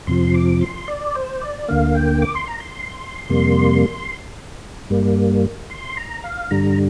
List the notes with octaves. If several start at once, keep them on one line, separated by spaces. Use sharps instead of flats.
F2 C3 F3 C6
D6
C6
D5
C5
D5
D2 D3 A#3 F5
G5
D6
C6
A#5
C6
F2 C3 G3 A#3
G2 G3 A#3
C6
A#5
F5
G2 D3 G3 A#5